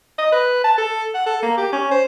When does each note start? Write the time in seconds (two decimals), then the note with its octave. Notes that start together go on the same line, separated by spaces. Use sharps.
0.18 D#5
0.32 B4
0.64 A5
0.78 A4
1.14 F#5
1.26 A4
1.43 A#3
1.57 G4
1.72 C#4
1.91 C5